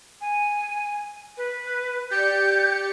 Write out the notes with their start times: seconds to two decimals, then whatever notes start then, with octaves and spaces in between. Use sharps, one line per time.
0.21 G#5
1.37 B4
2.11 G4 D5 G6 C#7